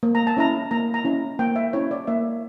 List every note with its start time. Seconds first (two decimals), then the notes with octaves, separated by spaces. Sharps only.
0.03 A#3
0.15 A#5
0.27 A5
0.37 C#4 E4 A#5
0.71 A#3 A#5
0.94 A#5
1.05 C#4 E4
1.39 A#3 G5
1.56 E5
1.73 C#4 E4 C#5
1.91 D5
2.07 A#3 E5